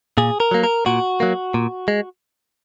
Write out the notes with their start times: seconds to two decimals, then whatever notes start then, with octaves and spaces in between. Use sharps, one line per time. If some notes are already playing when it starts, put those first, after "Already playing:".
0.18 A#2 G#4
0.40 A#4
0.51 F#3 A#3
0.64 A#4
0.86 A#2 F#4
1.20 F#3 A#3
1.54 A#2
1.88 G#3